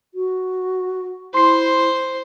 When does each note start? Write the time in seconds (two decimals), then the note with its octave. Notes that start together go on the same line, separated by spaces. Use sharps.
0.14 F#4
1.34 E4 C5 C6 C7